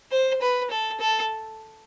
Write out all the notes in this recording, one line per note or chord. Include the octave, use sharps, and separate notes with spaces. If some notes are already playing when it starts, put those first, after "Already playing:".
C5
B4
A4
A4